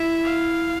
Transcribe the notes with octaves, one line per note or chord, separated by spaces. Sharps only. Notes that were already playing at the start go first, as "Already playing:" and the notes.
Already playing: E4 E5
F5